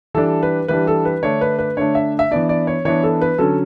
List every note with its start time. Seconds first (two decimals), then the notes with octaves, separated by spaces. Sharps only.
0.14 E3 G3 D4 A4
0.43 B4
0.68 E3 G3 D4 B4
0.87 A4
1.05 B4
1.23 D3 A3 D4 C#5
1.41 B4
1.58 B4
1.77 D3 A3 D4 C#5
1.95 E5
2.19 E5
2.31 E3 B3 D4 D5
2.49 D5
2.67 C#5
2.85 E3 B3 D4 C#5
3.03 A4
3.21 B4
3.38 D3 F#3 C#4 A4